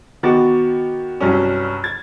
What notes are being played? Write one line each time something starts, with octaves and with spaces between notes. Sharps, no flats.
D#3 B3 F#4 D6 A6
C2 G2 F#3 C#4
G#6 A6